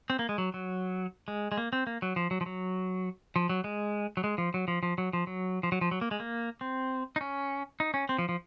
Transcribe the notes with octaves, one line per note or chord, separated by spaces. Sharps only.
C4
A#3
G#3
F#3
F#3
G#3
G#3
A#3
C4
A#3
F#3
F3
F#3
F3
F#3
F3
F#3
G#3
F#3
G#3
F3
F#3
F3
F3
F#3
F3
F#3
F3
F#3
F3
F#3
A#3
G#3
A#3
C4
D#4
C#4
D#4
C#4
C4
F3
F3